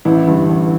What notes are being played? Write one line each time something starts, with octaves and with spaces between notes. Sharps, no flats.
A1 E4
G2 D3
A1